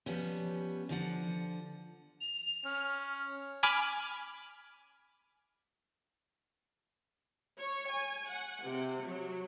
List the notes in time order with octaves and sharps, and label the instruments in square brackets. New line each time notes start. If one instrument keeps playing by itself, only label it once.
[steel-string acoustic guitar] F3 G3 B3 C#4
D3 F3 F#5
[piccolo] F7
[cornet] C#4 [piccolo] F6
[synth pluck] G#5 B5 D6 F6
[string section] C#5
G#5
F#5
C3
F#3